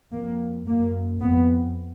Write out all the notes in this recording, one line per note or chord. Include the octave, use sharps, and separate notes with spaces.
F2 A#3
F#2 A#3
F2 B3